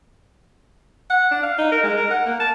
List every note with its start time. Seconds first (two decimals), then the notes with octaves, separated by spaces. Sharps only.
1.10 F#5
1.31 D4
1.43 F5
1.58 D#4
1.72 A#4
1.83 G#3
1.97 A#4
2.10 F#5
2.26 A#3
2.40 A5